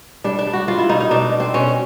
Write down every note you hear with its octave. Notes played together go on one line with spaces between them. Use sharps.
G3 D4
D4
G3
F#4
G3 F4
E4
B2 D#4
D#4
B2 D4
B2
C4
B2 C#4